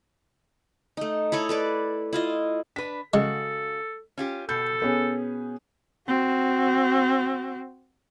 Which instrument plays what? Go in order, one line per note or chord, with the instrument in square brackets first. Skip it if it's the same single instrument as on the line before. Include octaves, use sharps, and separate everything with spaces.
[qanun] A3 D#4
E4 A4 C#5 D#5
A4 B4 D5
E4 F4 D#5
[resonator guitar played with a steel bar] D4 B4 [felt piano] B6
[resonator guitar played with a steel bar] C#3 F#4 [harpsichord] G#3 [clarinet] A4
[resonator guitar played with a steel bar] C#4 F4 G4
[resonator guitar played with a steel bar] B2 [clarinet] A4 [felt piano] G6
[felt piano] B3 C#4 G#4
[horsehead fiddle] C4 F#4